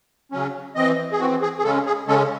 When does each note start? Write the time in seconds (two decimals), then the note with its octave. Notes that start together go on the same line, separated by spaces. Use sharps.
0.32 C#3 F#3 C#4
0.75 E3 C4 D#5
1.12 G#4
1.19 E3 C4 F#4
1.42 G#4
1.58 G#4
1.63 C#3 G#3 C#4 A4
1.86 G#4
2.07 C#3 G#3 C#4 A4